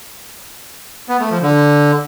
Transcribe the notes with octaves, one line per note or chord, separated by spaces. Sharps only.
B3
A3
F3
D3